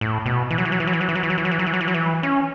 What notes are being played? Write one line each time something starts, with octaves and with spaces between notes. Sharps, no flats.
A2
B2
E3
F#3
E3
F#3
E3
F#3
E3
F#3
E3
F#3
E3
F#3
E3
F#3
E3
F#3
E3
F#3
E3
F#3
E3
C#4